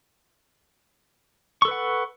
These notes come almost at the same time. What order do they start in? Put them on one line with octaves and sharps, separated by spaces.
C#6 A4 B4 F#5